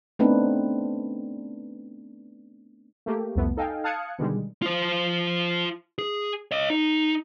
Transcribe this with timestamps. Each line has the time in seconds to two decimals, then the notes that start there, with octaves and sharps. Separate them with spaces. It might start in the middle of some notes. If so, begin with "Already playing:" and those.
0.19 A3 B3 C4 D4 D#4 B4
3.06 A3 A#3 G4
3.36 C2 F2 C3 A3 B3
3.57 D#4 A4 D#5 F5 G5 G#5
3.84 F5 A5 D#6 F#6 G#6 C#7
4.18 B2 D3 D#3 G3 G#3
4.62 F4 C5
5.98 G#4
6.51 C#5 D#5
6.70 D#4